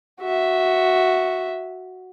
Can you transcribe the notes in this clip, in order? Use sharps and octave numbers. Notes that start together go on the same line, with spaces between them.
F#4 E5